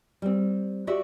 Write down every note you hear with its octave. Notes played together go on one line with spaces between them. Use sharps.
G3 C4
F#4 G4 D5 E5